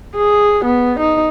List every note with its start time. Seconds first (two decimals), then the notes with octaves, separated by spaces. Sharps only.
0.16 G#4
0.65 B3
1.00 D#4